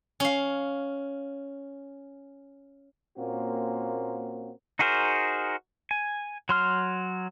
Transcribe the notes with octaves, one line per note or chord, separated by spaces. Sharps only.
C#4 F5
A#2 A#3 C4 C#4 F#4
D#4 F#4 G#4 A#4 C5
G#5
F#3 C6 F6